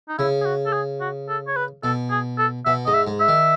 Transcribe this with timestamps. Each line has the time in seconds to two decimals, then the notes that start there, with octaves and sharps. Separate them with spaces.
0.09 D#4
0.18 C#3 E4
0.41 G#4
0.45 F#4
0.66 A4
0.73 G#4
1.01 F#4
1.29 A4
1.48 C#5
1.56 B4
1.83 B2 A4
2.11 G#4
2.38 A4
2.65 B2 E5
2.87 G#2 D#5
2.94 E5
3.07 G#2
3.20 E5
3.28 D#3